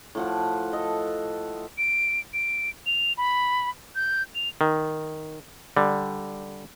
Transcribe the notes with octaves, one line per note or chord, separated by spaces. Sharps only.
A2 F3 F#5
A4 D#5
D7
D7
F7
B5
G6
F7
D#3
D3 G3